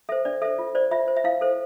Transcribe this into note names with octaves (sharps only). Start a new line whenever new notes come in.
A4 C5 E5
D4 D5
A4 C5 E5
F4
C5 D5
F4 E5
C5
E5
E4 F5
A4 C5